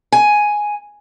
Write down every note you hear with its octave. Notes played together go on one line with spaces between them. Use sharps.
G#5